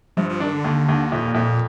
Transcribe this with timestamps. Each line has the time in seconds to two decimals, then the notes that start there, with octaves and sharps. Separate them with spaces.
0.17 G2 F3
0.30 F3
0.40 D#3 D4
0.53 D3
0.64 D#2
0.88 D#2
1.12 F2 A#2
1.35 F2 A#2